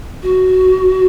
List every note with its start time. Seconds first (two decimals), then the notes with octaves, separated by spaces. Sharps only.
0.23 F#4